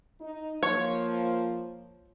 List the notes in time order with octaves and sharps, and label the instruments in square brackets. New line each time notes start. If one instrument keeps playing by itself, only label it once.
[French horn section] D#4
[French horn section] F3 A#3 [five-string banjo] C#5